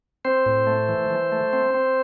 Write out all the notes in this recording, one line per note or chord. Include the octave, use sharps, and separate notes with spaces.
C4 C5
A2
A3
E3
E3
A3
C4
C4